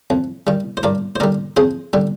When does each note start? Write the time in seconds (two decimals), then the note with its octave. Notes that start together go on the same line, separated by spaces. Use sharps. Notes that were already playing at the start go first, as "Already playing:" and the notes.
0.10 F2
0.47 D#3 G3
0.77 C5
0.83 G2 A#4 D5
1.16 C5
1.20 D3 G3 A#4 D5
1.57 F2 G#4 C5
1.93 D3 G3